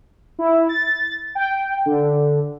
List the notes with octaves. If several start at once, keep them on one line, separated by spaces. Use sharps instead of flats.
E4
A6
G5
D3